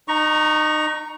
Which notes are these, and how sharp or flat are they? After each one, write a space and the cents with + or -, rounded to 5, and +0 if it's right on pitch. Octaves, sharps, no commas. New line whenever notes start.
D#4 -25 A#5 +15 C#6 +0